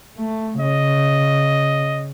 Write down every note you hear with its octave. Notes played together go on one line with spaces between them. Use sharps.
A3
C#3 D#5